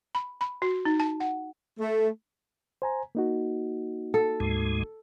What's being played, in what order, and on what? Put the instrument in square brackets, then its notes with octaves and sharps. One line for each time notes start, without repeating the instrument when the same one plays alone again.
[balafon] B5
B5
F#4
D#4
A5
F#5
[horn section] A3
[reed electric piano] C5 G#5 A#5
A#3 D#4 F#4
[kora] A4
[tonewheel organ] D2 G#2 G#3